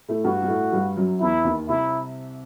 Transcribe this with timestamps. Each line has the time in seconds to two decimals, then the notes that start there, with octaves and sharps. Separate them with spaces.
0.08 A2 A3
0.24 G2 G3 F#4
0.42 G3
0.48 A2 A3
0.72 G2 G3
0.96 F#2 F#3
1.20 E2 E3 E4
1.44 D#2 D#3
1.69 C2 C3 E4